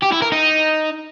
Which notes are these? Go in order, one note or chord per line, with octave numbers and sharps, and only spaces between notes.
G4
E4
A#4
D#4